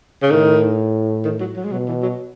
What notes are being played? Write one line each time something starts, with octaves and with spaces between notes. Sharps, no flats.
C#3
A2 D#3
D#3
F#3
F#3
G#3
B2 F#3
E3
F#3